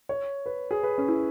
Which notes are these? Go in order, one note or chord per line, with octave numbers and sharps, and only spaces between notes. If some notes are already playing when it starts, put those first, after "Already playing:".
C#5
B4
G#4
B4
C#4
E4